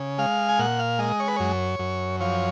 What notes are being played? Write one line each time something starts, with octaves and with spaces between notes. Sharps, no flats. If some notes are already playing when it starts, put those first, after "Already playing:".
Already playing: C#3
G#3 F5
G#5
A#2 F#5
F5
G#3 D#5
C#5
B4
F#2 C#5
F#2
F3 C#5